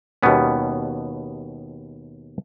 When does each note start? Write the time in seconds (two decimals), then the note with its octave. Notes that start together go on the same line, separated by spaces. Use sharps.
0.23 D#2 B2 G3 B3 C#4